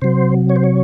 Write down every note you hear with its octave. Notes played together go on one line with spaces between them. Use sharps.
C3 F#3 C5
C#5
C5
C#5